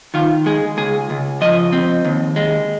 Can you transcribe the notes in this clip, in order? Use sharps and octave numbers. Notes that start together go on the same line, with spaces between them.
D#3 F4
G#3 G#4
C#2 G#4
C#2
F3 D#5
C4
D#2
G#3